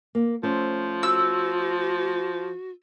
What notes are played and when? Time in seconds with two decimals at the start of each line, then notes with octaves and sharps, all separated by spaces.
0.15 A#3
0.43 F3 A3 C#4 C5
1.03 F#4 E6